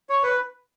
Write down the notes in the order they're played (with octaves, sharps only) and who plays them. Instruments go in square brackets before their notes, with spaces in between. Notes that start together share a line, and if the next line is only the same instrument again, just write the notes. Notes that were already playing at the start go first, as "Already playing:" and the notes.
[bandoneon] C#5
B4